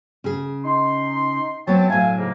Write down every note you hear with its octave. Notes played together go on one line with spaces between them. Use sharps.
C#3 G#4
D#4 C6
F#3 B3 C4 C#5 G5 A5
A2 F#3 E5 F5 G#5
G#2 C#3 A#3